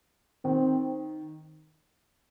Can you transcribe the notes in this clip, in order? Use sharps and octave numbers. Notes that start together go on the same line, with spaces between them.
D#3 C4